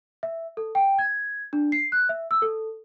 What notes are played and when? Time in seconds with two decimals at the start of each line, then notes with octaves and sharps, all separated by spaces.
0.23 E5
0.57 A4
0.75 G5
0.99 G#6
1.53 D4
1.72 C7
1.92 F#6
2.09 E5
2.31 E6
2.42 A4